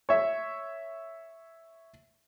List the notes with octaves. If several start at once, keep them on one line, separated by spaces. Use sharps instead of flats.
C#5 E5